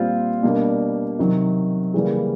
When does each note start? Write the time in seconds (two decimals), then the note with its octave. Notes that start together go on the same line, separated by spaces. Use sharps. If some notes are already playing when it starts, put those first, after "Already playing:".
Already playing: A#2 G3 C4 F4
0.43 B2 G3 A#3 D4
1.19 C3 D#3 F#3
1.94 C#3 E3 G3 A#3